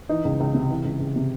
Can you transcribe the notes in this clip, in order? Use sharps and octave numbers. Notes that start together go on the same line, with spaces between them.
E3 D#4
C#2
C#2
C3
E3
C#2
C#2
C3